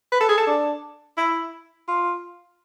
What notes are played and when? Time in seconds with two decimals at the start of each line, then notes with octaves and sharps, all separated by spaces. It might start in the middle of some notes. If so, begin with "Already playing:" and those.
0.12 B4
0.20 A4
0.29 G#4
0.37 A4
0.47 D4
1.17 E4
1.88 F4